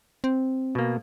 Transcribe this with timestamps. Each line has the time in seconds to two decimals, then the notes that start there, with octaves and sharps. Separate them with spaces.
0.24 C4
0.75 B2 A#3